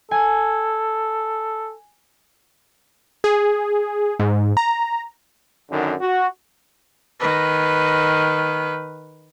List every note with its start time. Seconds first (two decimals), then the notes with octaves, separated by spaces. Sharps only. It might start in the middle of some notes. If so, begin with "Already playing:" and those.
0.11 A4 G#5
3.24 G#4
4.20 G#2
4.57 A#5
5.70 F#2 D3 D#3
6.00 F#4
7.20 D#3 B4